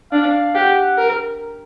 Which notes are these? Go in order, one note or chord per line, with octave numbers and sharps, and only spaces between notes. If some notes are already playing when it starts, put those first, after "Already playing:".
D4 F5
G4 F#5
A#4